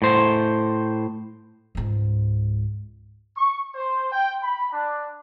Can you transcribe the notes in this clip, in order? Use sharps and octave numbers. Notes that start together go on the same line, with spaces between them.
A2 C5
C#2 G#2
C#6
C5
G5
B5
D4